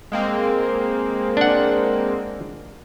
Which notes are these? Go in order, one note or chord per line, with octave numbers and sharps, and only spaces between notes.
G#3 A#3 C4
D4 F#5